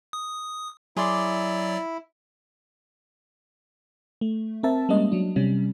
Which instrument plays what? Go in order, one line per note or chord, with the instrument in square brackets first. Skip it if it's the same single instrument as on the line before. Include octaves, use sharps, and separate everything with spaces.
[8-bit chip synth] D#6
[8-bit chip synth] F#3 D5 [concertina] E4 [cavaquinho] G#4 C6 D6
[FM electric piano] A3
C4 A#4 E5 A5
G3 G#3 A#3 C#4 D#5
F#3 D4
C3 G3 C#4